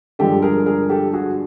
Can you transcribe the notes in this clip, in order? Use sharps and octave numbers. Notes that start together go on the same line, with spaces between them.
G2 D3 F3 G#3 G4 A4
G#4 A#4
G#4 A#4
G4 A4
F#4 G#4